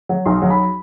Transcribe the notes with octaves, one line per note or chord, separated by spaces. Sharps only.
F#3
B1 C6
F#3
B5